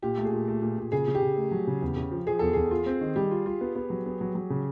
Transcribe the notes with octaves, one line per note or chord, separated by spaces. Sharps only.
A#2 G4
A3
G#4
A#2
A3
A#2
A#2
C#3 G#4
C#3
G4
C#3
A3
F#3
C#3
E2
C#3
F3
F3 G#4
E2 A4
E2 G#4
F4
C4
D#3
G3 G4
F4
F4
B3
B3
F#3
B3
F#3
F#3
C#3